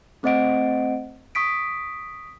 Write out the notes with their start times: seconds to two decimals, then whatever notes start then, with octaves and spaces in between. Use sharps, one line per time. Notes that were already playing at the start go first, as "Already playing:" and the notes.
0.23 A3 C4 C5 D#5 F#5 D7
1.35 C#6 D#6 B6 D7